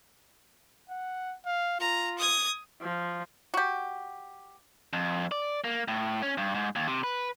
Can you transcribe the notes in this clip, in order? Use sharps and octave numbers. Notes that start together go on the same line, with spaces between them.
F#5
F5
F4 A#5
D#6 G#6
F3
F#4 G4
F2
D5
A#3
A2
C#4
G2
G#2
D#2
C3
B4